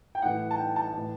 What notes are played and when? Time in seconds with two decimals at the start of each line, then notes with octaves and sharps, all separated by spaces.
0.15 G5
0.22 A2 E3 F#5
0.51 A5
0.57 G5
0.76 A5
0.93 A2 E3